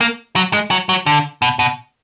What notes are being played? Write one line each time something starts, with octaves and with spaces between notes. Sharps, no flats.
A#3
F#3
G#3
F#3
F#3
D3
B2
B2